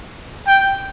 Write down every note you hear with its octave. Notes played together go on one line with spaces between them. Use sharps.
G5